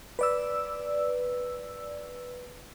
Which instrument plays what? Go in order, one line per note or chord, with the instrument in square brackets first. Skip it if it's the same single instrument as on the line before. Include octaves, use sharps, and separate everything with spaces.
[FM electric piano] B4 D5 E6